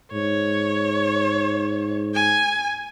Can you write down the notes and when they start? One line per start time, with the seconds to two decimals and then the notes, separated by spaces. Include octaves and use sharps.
0.13 G#2 C#5
2.14 G#5